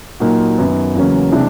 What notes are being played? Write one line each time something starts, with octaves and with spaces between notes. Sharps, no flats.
A#2 F#3 A#3 D#4 F#4
F#2 D#3 F#3 B3
E2 C#3 F#3 A#3 C#4
C3 E3 G#3 B3 D4